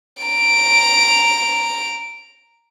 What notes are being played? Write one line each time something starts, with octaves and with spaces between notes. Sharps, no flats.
A#5 D7